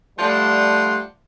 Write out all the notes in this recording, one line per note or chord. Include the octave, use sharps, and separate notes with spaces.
F3 G3 A3 D4 F#5 C6